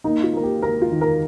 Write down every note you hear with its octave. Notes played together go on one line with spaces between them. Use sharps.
A#3 D#4
F4
A#3 A#4
G4
A#3 A#4
F4
D#3
A#4